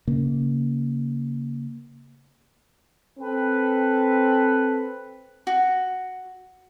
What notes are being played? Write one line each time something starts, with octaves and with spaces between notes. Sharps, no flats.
C#3 A#3
C4 A4 B4
F#4